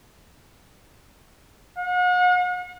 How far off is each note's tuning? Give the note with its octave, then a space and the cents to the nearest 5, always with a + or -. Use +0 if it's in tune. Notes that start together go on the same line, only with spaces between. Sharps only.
F#5 -40